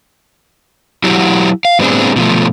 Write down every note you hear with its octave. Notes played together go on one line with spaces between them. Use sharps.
F#3 E4 F#4 G4
F5
A2 G3 B3 C4 D4 G#4
B2 F3 A3